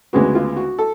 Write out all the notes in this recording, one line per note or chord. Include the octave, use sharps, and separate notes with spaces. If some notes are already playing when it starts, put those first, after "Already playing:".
D2 C#3 G#3 B3 F#4
F4
F#4
A4